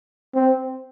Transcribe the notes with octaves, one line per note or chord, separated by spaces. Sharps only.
C4